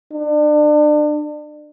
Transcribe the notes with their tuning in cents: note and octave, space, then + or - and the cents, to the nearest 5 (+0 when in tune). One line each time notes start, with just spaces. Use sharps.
D4 +35